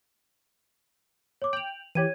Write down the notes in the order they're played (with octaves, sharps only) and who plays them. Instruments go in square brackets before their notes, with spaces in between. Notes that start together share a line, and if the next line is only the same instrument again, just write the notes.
[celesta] C#5 D6
[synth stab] G5 [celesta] F7 F#7
[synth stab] E3 G4 [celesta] C#5 G#6 D#7